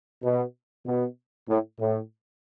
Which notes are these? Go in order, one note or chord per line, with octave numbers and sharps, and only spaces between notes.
B2
B2
A2
A2